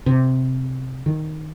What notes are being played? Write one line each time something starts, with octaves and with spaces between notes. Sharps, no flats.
C3
D#3